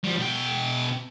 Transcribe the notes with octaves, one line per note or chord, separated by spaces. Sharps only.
F3 G3
B2 G5